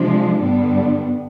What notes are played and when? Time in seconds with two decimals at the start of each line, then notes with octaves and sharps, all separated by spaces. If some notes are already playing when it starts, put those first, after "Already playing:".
Already playing: C3 F3 G#3 D4
0.39 G2 D3 G3 B3 D4